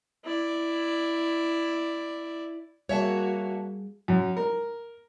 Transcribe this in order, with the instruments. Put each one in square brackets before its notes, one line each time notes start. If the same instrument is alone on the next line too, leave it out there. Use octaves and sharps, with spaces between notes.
[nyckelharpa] E4 D5
[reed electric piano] G3 G#4 [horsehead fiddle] A#3 F#4 [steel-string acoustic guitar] C#5 E5 A5
[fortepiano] F#2
A#4